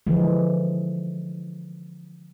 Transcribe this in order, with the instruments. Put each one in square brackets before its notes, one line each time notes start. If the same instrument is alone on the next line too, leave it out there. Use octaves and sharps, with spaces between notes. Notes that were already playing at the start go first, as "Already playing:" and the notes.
[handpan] D3 E3 F3 G#3